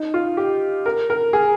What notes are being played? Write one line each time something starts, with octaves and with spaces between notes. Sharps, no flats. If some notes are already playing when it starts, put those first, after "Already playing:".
Already playing: D#4
F4
G4
A#4
A#4
G#4